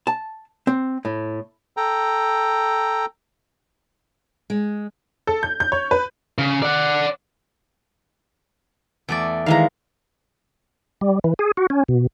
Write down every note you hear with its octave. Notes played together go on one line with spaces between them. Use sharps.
A5
C4
A2
A4 G5 A#5
G#3
A4
G6
G6
C#5
B4
C#3
D5 F#5
E2 A3 D5
D#3 E3 G#3 F5 A#5
G3
E3
G#4
F#4
C#4
B2